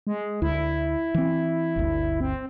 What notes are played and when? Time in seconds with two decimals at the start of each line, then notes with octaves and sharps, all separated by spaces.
0.07 G#3
0.42 D2 E4
1.14 E3 C4
1.76 G1 D2
2.20 C4